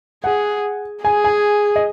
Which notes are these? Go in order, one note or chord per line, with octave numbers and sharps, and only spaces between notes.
G#4 F#5
G#4 G#5
G#5
D#5